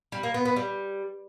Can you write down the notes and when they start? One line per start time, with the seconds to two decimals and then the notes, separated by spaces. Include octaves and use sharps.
0.12 G3
0.23 A#3
0.34 B3
0.45 B3
0.56 G3